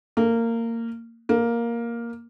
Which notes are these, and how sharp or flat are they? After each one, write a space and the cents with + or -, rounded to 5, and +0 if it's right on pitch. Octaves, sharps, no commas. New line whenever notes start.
A#3 -20
A#3 +5